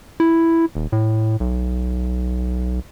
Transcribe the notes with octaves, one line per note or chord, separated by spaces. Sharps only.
E4
D#1
A2
B1